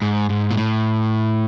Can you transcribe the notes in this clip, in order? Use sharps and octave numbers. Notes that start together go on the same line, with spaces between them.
G#2
G#2
A#2
A2